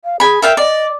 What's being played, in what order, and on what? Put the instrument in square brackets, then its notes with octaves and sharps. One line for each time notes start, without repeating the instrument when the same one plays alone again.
[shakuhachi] F5
[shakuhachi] G#4 [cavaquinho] G#5 B5
[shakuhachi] A#4 [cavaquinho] E5 F5 G5
[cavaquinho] D5 [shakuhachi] D#5